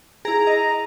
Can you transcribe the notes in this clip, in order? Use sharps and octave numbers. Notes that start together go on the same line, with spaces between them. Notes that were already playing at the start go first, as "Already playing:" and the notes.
E4 G#4 A#5
D#5